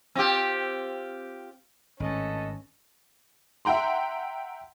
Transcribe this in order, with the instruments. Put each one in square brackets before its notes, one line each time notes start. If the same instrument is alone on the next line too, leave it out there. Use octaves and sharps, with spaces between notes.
[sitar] C4 F4 G4
[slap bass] G#1 A2 [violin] C#4 [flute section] A4 B4 D#5
[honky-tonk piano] E5 F#5 G5 A#5 C6